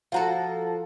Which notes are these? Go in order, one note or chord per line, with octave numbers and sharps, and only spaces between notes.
F3 F#4 A4 F5 F#5 A#5